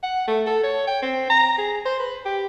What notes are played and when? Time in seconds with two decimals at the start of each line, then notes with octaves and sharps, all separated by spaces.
0.03 F#5
0.27 A3
0.47 A4
0.63 C#5
0.87 G5
1.02 C4
1.30 A#5
1.58 G#4
1.86 C5
2.00 B4
2.25 G4